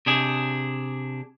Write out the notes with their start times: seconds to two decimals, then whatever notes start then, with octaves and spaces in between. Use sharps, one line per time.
0.06 C3 D4 G#4